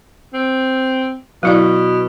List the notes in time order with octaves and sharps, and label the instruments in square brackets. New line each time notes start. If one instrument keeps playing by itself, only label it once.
[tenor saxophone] C4
[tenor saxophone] B2 [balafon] F#3 E4 D5